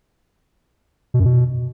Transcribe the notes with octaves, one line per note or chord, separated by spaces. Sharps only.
B2
F#2
B2